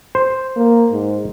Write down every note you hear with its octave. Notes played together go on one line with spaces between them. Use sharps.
C5
A#3
G#2